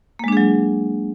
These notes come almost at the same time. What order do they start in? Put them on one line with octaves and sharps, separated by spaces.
A#3 G#3 D4 G#4 F#3